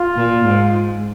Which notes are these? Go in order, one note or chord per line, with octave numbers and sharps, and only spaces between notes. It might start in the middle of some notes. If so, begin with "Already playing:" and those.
Already playing: F4
A#2
G#2